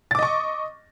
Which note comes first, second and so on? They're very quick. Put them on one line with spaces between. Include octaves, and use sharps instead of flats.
A6 D6 D#5 C#6